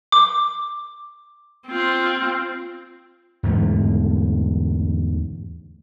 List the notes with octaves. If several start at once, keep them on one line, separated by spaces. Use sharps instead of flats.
D6
C4 F4
E2 G#2 D3 A3